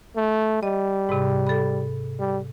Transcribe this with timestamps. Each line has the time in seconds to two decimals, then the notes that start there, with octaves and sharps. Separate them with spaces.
0.16 A3
0.63 G3 D#5
1.09 G#2 C3
1.47 A4 B5
2.20 G3